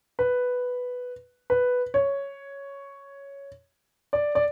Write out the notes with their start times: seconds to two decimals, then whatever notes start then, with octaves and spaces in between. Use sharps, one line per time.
0.19 B4
1.50 B4
1.94 C#5
4.13 D5
4.35 D5